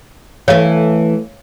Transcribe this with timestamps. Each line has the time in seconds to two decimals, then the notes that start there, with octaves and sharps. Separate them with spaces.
0.48 E3 A3 C#5 F5